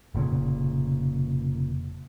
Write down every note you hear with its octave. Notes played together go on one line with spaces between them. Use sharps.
F1 A#2 C#3